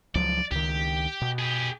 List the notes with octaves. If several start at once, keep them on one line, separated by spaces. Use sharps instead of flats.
C#2 F3 F#3 D5
C#2 D#3 G4
B2
G4 G#4